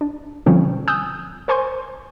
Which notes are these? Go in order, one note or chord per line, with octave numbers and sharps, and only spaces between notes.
D4
B2 D3 F3 G3 C4 C#4
G#5 D#6 E6 F#6 G6
A#4 C5 G#5 C6 C#6 G6